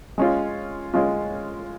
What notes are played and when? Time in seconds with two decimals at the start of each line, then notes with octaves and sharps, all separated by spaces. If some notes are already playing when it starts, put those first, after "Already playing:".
0.18 G#3 C#4 F4
0.94 G#3 C#4 F4